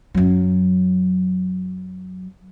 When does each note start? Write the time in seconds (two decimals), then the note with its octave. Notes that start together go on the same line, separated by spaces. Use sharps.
0.14 F#2 F#3